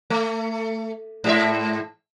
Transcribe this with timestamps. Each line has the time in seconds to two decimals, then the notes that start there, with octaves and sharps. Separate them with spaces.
0.10 A3
1.24 G#2 G4 E5